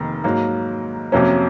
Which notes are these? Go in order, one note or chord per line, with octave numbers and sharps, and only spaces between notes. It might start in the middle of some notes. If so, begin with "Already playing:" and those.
Already playing: F1 D#3 A#3
G#2 F#3 A#3
F2 C3 F#3 A#3 C#4